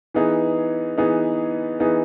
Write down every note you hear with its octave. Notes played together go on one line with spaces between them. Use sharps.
E3 B3 D#4 G#4
E3 B3 D#4 G#4
E3 B3 D#4 G#4